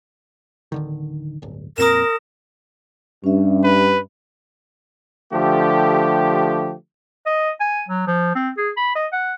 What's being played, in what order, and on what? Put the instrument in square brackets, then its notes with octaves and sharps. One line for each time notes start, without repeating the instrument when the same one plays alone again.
[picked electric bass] D1 D3 D#3
D1 G1
[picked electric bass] F2 A#2 C4 [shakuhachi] A#4 [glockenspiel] D#6 A#6 E7
[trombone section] G2 [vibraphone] C#4 E5
[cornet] B4
[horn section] D3 F3 A3 G4
[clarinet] D#5
G#5
F#3
F3
C4
G#4
B5
D#5
F#5